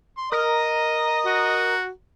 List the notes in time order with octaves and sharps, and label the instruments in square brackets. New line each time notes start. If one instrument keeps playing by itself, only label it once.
[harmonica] C6
[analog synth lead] A#4 [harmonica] D#5 D#6
[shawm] F#4